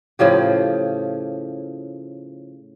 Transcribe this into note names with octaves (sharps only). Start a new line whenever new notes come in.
A2 C#3 F3 G4